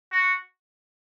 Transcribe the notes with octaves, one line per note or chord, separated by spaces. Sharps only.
F#4